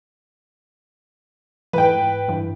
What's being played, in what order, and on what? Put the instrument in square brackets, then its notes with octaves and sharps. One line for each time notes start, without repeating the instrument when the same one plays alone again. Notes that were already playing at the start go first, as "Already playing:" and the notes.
[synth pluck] G#2 E3 [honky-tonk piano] B4 G5
[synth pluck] G2 E3